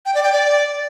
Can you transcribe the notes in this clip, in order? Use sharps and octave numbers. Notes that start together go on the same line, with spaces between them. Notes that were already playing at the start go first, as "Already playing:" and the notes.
G5
D5
G5
D5